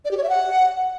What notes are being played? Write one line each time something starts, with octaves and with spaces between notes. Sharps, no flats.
D5
G4
C#5
E5
F#5